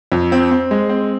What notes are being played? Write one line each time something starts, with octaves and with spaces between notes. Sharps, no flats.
F2
C4
C4
G#3
C4